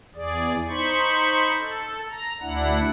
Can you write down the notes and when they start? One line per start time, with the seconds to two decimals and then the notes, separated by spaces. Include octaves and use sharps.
0.15 E2 G#4 D5
0.68 D#4 C5 B5 C#6
1.58 A4
2.11 A#5
2.41 D2 D4 E4 F#5